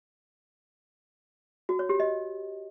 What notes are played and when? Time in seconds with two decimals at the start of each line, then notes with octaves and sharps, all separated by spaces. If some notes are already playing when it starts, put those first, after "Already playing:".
1.69 F#4
1.79 C#5
1.89 G4
2.00 D#5